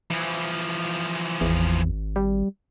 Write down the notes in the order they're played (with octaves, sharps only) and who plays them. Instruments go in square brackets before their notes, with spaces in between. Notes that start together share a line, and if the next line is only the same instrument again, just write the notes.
[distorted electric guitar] E3 F3
[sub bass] G#1 [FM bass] E2
[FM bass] G3